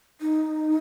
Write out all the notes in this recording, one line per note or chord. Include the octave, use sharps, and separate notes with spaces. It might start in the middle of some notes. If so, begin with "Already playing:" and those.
D#4